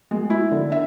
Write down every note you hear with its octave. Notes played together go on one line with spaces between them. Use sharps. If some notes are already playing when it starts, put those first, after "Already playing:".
G#3
E4
D3
E5